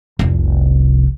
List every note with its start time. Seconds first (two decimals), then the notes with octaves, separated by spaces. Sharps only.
0.19 F1 C2